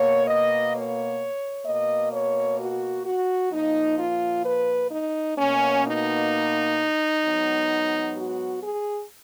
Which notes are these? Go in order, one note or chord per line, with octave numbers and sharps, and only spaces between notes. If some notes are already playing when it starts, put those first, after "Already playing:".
Already playing: B2 A#3 C#5
D#5
C#5
B2 A#3 D#5
C#5
F#4
F#4
A#2 F3 A#3 D#4
F4
B4
D#4
B2 A#3 C#4
D#4
G#2 F#3 B3
F#4
G#4